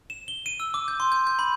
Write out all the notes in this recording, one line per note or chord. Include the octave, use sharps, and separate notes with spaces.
E7
G7
D#7
E6
D6
G6
C6
G6
G6
B5